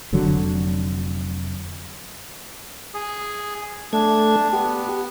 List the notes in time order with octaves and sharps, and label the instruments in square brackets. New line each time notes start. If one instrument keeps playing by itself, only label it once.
[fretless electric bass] F1 D3 F#3
[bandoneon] G#4
[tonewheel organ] A3 G#6 [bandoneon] D4
[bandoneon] B3 [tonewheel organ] G4